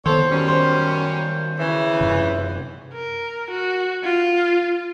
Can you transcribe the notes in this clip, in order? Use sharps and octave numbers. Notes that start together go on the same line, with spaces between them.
D#3 B3 A4 C5 C#5
F#2 G3 C#4
C5
C#3 E3
F#2 C3
A#4
F#4
F4